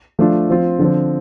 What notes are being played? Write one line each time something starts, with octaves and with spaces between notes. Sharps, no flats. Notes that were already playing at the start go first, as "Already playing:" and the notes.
F3 A3 D4 F4
F3 C4 F4
D3 F3 C4